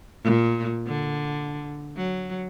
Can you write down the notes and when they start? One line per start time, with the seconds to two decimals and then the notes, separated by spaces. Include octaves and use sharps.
0.24 A#2
0.88 D3
1.97 F#3